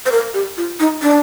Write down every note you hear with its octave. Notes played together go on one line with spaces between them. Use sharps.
C5
A#4
G4
F4
D#4
D4